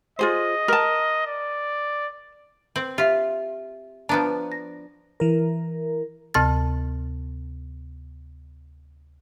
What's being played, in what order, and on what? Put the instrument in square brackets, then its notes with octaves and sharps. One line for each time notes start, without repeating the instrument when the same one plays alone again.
[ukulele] F4 G#4 C5 [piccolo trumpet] D#5
[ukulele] A#4 A5
[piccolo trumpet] D5
[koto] C4 [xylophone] F#7
[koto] F4 [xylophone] G4 E5
[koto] F3 B3 D4 [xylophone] A#5
[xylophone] A#6
[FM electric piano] E3 A#4
[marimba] D2 C3 A5 F6 A6